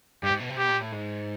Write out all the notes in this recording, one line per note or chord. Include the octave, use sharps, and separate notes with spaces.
G2 G4
G#2
B2
C3
B2 G4
A#2
A2
G#2